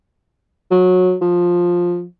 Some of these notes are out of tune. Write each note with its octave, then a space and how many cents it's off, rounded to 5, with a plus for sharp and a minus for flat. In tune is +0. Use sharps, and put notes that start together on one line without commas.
F#3 -20
F3 +10